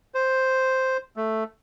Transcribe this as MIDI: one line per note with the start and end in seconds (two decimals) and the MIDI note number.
0.14 0.97 72
1.17 1.44 57